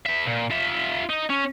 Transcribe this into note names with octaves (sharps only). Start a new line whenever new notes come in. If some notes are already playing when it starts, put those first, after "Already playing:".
B3 E5
A#2
F4 E5
D#4
C#4